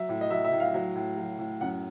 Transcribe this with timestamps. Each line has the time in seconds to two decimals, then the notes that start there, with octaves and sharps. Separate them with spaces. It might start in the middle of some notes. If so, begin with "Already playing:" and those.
Already playing: F#3 E5
0.09 A2
0.21 D#5
0.30 F#3 E5
0.44 E5
0.52 A2
0.60 F5
0.74 F#3
0.95 A2
1.17 F#3
1.39 A2
1.61 F#2 F#5